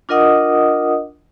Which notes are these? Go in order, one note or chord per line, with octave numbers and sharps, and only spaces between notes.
D4 F4 A#4 D#5 F#5 D#6